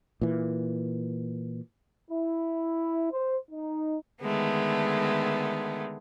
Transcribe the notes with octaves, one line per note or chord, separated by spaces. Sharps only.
A#2 E3
E4
C5
D#4
D3 D#3 G#3 A3 B3